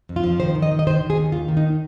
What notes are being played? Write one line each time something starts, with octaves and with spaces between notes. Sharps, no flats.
F2
F4
F3
D#3 C5
D#3
D#5
D#3
D#5
D#3 C5
D#3
G#4
D#2
D#2 F4
D#3
D#4